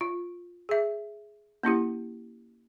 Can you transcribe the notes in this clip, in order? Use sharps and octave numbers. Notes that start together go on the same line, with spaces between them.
F4
G#4 E5
A#3 C#4 E4 G4